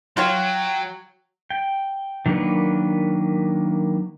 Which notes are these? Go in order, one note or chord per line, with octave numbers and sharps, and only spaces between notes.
F#3 F4 F#4 C#5 G5
G5
D#3 F#3 A#3 D4 B4